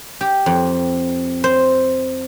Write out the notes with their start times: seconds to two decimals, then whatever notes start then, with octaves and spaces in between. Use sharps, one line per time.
0.21 G4
0.46 F2
1.44 C5